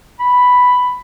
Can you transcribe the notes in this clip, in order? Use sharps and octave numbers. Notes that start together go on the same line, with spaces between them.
B5